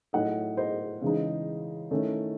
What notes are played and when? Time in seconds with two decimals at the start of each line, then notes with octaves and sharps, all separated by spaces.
0.13 A2 F#3 A3 D#4 D#5 F#5
0.57 C5 D#5
1.01 C#3 E3 G#3 D#4
1.91 D#3 A3 C#4 E4